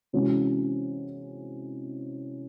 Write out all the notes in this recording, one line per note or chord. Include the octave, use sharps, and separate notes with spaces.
C3 E3 G#3 C#4 F#4